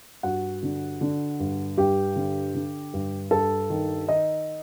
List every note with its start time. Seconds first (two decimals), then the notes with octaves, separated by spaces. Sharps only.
0.23 G2 F#4 F#5
0.63 D3
1.01 D3
1.40 G2
1.77 G2 G4 G5
2.16 D3
2.55 D3
2.94 G2
3.31 G2 A4 A5
3.70 D#3
4.09 D#3 D#4 D#5